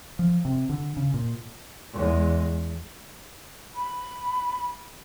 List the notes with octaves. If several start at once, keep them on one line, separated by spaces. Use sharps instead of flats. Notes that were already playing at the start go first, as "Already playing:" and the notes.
F3
C3
D3
C#3
A#2
E2 G#3
B5